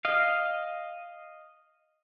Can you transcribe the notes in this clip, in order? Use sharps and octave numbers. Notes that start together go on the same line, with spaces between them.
D#5 F5